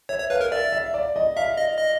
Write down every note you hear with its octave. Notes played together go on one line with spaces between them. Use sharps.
C#5 E5
C#5
B4 F5
A#4
D5 E5
E5
D5
D#5
E5 F5
D#5
D#5